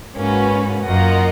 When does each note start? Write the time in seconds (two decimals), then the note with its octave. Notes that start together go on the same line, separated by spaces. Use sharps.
0.16 G#2 A#3 C#4 F#4 B4
0.86 F#2 A#3 F4 A#4 D#5 F#5